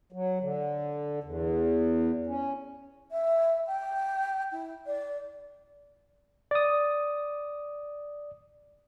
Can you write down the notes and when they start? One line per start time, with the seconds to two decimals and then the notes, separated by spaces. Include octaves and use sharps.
0.12 F#3
0.41 D3
1.24 E2
2.27 C#4
3.11 E5
3.67 G5
4.52 E4
4.86 D5
6.51 D5 D#6